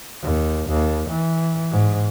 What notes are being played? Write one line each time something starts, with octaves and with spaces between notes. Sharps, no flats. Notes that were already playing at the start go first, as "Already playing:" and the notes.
D#2
D#2
E3
G#2